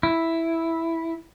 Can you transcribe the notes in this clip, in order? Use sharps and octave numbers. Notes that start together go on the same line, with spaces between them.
E4